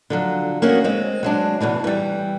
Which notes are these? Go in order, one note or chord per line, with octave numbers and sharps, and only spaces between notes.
D3 F3 F#3
A#3 C#4 F#4 G#4
G#3 C4
F#3 G#3 D4
E2 B2 D3 E3
E3 G3